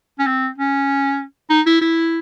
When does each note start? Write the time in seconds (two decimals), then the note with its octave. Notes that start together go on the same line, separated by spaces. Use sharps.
0.19 C#4
0.27 C4
0.58 C#4
1.50 D#4
1.66 E4
1.81 E4